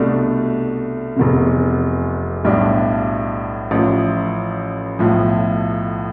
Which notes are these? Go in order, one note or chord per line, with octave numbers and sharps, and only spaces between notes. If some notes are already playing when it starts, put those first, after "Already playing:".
Already playing: C2 B2 A3 D4
F1 E2 C3
B1 A2 G3 D4 G4
A1 A2 F3
B1 A2 F3